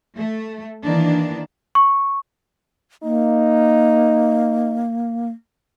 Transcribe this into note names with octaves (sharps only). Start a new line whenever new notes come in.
A3
D#3 E3 A#3 D4
C#6
A#3 D#4